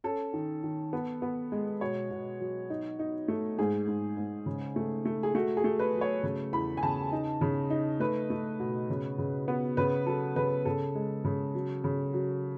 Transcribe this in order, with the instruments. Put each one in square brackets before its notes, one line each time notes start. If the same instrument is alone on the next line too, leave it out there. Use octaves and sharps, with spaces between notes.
[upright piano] C#4 A4
D#3
D#3
B3
B3
G#3
B2 C#5
B2
F#3
D#4
D#4
A3
G#2 G#4
G#2
G#2
C#3
A3
A3
G#4
A3 F#4
G#4
A3
B4
F#3
C#5
C#3
E2 B5
G#5
C#3 A5
D#4
C#3
D#4
A3 B4
A3
B2
C#3
C#3
B3
C#3 B4
F#3 A4
C#3 B4
C#3 A4
G#3
C#3
F#3
C#3
F#3